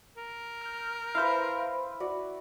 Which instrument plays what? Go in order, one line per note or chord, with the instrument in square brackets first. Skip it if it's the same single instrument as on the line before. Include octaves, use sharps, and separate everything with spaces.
[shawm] A#4
[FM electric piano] F6 G6
[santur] E4 B4 [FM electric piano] C5 F5
[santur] F#4 D5